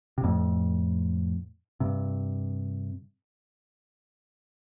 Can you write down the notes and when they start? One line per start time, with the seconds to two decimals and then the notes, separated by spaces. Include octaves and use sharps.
0.18 C3
0.24 F2 A2
1.80 G2 C3